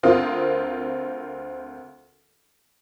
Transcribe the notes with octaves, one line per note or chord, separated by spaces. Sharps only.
D2 C4 F4 A#4 D#6